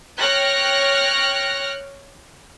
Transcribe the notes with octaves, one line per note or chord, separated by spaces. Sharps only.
C#5 G5 F6 F#6 A#6